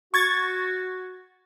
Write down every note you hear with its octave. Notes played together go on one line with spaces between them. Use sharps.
F#4 C#6 G#6 A6